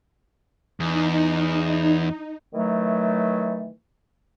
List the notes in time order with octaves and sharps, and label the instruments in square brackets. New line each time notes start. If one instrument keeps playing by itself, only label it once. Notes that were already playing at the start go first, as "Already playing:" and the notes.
[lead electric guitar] E2 [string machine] D#4
[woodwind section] D#3 E3 F#3 A3